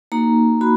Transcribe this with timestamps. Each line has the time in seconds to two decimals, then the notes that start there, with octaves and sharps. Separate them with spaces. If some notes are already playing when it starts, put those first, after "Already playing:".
0.12 A#3 D#4 F#4 A#5
0.61 F#4 B5